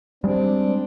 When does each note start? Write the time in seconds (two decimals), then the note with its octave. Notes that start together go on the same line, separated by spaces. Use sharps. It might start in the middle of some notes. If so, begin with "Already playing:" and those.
0.24 G3 G#3 C4 D4